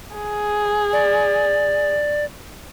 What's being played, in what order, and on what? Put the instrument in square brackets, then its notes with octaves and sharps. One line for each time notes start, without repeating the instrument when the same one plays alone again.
[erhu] G#4
[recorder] D5